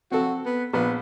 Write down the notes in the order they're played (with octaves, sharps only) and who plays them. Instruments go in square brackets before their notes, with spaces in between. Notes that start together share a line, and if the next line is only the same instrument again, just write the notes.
[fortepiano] C4 A4 [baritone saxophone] F#4
[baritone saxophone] B3
[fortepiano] A#1 [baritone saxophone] B3